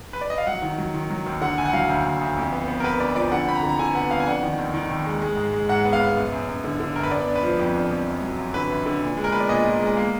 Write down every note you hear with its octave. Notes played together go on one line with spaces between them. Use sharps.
B4
D5
D#5
F5
F#3 F#5
D#3
F#3
D#3
F#3
D#2
D3 F#5
D2 G#5
F#5
F#3 F5
D2
D2
D2
F2
B3
B3
A#4
B3 B4
D4 D5
F3 D5
D3 F#5
F2 B5
A#5
D3
A#5
D3 G#5
B3 F#5
F2 F5
G#5
D4 F#5
D#3
D#2
D#3
D#2
G#3
G#3
G#2
G#3
G#2 F#5
B3
F5
B3
F#2
F#2
F#2
D3
D3
F#2 A#4
B4
B3 D5
D4
B4
F3
F2
D4
F2
F#2
F#3
F#2
D3 B4
F#2
D3
A#2
G#3
A#4
B3 B4
D5
A#2 D#5
A#2
G#3
A#3